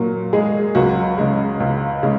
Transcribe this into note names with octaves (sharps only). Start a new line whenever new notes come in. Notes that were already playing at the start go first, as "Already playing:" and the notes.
Already playing: A#2 F#3 F#4
G#3 G#4
C#2 F#3 F#4
C#3 G#3
C#2
C#3 G#3